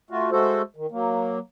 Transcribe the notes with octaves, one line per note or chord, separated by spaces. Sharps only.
A3 F4 F#4
G#3 A3 F#4 A4 C5
D#3
F#3 A#3